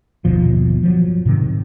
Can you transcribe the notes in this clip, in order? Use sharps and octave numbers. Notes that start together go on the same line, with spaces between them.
G1 D#2 B2 F3
F3 F#3
G#2 C3 D#3